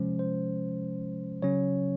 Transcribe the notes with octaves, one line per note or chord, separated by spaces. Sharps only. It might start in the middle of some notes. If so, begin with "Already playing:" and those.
Already playing: C3 F3 G#3 C#4 C5
C5
C#3 F#3 C#4 C#5